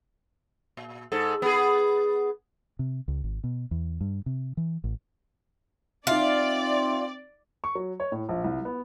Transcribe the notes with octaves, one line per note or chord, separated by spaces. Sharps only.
A#2
G#2 A4
B3 G#4
C3
C#2
G#1
B2
E2
G2
C3
E3
A1
C4 D#4 F4 D5 E5
C#6
F#3
C#5
A2
A#1
C2
B3